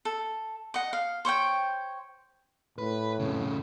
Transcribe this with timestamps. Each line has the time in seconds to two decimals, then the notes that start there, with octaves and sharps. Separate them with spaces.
0.05 A4
0.74 D#5 F#5
0.93 F5
1.25 C5 C#5 E5 G5
2.78 A2 B4
3.19 F2 C#3